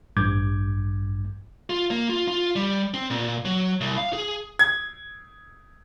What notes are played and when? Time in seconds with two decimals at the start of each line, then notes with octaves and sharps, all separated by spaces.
0.17 A1 G2 D6 G6 G#6
1.70 F4
1.90 A#3
2.09 F4
2.28 F4
2.56 G3
2.94 C4
3.10 A#2
3.45 F#3
3.81 C2
3.97 F5
4.13 G#4
4.59 G#6